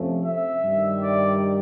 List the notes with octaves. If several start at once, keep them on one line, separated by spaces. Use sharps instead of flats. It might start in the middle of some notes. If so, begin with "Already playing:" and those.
Already playing: F2 C3 F3 A3 C#4
E5
G2 D#3 G3
D5